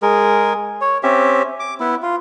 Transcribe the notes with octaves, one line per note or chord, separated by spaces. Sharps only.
G#3 G#4 A#4
C#5
C4 C#4 G4 E5
D6
B3 E4
F4